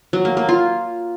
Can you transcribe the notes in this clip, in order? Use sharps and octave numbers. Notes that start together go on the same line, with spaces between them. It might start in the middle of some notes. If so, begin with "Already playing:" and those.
F#3
A#3
A#3
F4